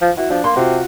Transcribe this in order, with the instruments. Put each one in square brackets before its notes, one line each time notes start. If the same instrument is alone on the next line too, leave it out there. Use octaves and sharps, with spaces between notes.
[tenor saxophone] F3
[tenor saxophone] E4 [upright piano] F#4
[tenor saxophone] F3 [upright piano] D4
[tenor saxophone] A#3 [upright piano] C6
[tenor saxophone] C3 [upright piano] F4 F#4